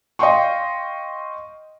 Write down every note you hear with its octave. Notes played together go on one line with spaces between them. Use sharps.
D#5 F5 G5 C6 C#6